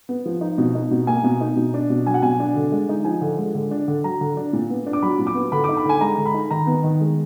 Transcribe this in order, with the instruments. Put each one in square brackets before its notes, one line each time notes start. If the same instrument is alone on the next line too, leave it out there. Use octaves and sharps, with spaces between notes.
[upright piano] B3
F3
D#4
B2
D#4
B2
A#3 G#5
B2
D#4
B2
D4
B2
F#3 G#5
F#5
B2 G#5
D4
D3
G#3
D#4
F3 G#5
D3
G#3
D3
D4
D3
F#3 A#5
D3
D4
A#2
B3
D4
D6
F#3 B5
A#2
D6
B3
D3 B5
D#4 D6
B5
D3 G#5
G#3 A#5
D3
B5
D#4
D#3 A#5
B3
D#3
G#3